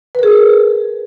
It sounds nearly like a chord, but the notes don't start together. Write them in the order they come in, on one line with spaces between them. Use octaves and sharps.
B4 A#4 G#4